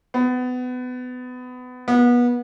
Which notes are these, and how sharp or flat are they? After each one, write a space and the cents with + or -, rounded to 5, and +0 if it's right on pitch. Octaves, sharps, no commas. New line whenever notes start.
B3 +25
B3 -25